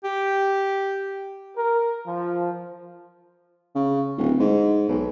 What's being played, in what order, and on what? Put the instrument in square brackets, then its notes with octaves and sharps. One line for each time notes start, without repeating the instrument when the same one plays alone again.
[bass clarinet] G4
[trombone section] A#4
F3
[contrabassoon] C#3
D1
G#2
B1